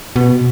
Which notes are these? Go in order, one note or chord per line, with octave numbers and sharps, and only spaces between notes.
B2